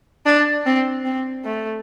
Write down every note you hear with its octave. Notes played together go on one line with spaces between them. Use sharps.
D4
C4
C4
A3